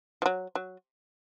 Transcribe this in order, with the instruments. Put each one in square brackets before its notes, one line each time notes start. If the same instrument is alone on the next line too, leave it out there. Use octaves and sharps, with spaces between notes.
[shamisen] F3
F#3
F#3